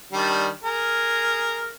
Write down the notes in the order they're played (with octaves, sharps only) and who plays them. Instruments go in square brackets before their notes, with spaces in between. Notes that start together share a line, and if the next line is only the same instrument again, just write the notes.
[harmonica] D#3 G3 D4
G#4 A#4